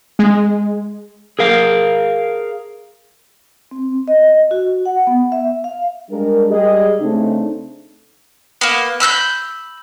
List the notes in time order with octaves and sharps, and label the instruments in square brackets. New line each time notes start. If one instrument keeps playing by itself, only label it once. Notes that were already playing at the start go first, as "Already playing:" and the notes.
[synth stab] G#3
[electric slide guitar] G#4 A#4 F5
[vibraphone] C4
D#5
F#4
F#5
B3
E5
F5
[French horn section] G3 G#3 D4 A#4
G3 G#3 G4 G#4 D#5
C#3 A3 C4 D4 D#4
[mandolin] A#3 B3
B5 E6 F#6 G6